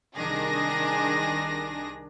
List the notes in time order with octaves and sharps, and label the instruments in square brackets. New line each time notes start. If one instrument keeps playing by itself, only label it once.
[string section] C2 D#3 D4 G#4 A#6